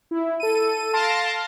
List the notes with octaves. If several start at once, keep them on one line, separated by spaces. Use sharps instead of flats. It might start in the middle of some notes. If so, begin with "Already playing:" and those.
E4
A4 D#7
F5 A5 C6 A#6 D7